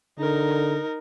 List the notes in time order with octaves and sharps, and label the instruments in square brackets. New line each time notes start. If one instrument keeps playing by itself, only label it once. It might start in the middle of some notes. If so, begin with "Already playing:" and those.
[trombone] D3 [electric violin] D#4 A#4